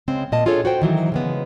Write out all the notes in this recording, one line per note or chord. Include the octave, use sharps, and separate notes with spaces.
C#3 G#3 C4
A#2 D#5 A5
D4 F4 G#4 A4 C#5
F#4 C5 G5
D#3 E3 F#3 F#4
C#3 G#3 B3